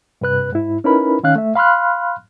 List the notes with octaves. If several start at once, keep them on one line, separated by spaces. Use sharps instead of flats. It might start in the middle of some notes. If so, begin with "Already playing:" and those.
G2 C3 B4 F#6
G#2 E4
C#4 D#4 E4 A#4 B4 B5
D#3 C#4 F5 F#6
A3 E5
F5 B5 C6 F6 F#6